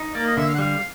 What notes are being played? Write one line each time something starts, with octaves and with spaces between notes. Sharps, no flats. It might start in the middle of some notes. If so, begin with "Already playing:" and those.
Already playing: D#4
A#3 D5
D#5
D3 E5
F5
F#5
G3 F5